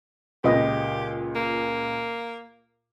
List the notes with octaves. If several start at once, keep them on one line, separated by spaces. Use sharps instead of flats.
C#2 A#2 G4 B4 D#5
A#3